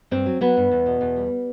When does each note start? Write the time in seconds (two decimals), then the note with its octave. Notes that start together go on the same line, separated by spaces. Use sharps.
0.11 G2 C4
0.26 F#3
0.41 F#3 B3
0.57 G2
0.71 E2
0.86 B2
1.01 E2
1.16 G3